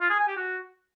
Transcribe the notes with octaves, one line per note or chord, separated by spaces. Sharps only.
F4
G#4
G#5
G4
F#4